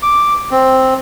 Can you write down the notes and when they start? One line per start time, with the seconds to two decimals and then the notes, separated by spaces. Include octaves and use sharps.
0.03 D6
0.51 C4